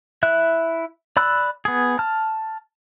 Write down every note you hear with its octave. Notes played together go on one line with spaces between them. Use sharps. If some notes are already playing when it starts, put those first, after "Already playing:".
E4 E5 F#6
D5 B5 E6 F#6
B3 G#4
A5 F6